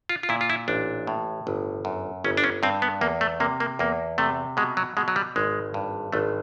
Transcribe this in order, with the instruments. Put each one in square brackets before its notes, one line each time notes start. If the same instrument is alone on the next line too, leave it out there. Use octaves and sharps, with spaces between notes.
[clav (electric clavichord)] F4
F4
A#2 E4
F4
E4
A1 D4
A2
G1
F#2
G1 C#4
D4
C#4
G2 C4
B3
E2 A#3
A3
C3 A#3
A#3
E2 A#3
C3 A3
B2 G#3
F#3
B2 G#3
F#3
G3
G#1 G#3
G2
G#1 A3